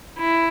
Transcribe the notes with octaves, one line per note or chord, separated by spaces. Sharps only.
E4